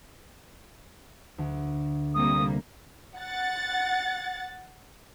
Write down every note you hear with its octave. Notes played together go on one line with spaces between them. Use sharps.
D2
C3 G3 A#3 D#6
F#5 A6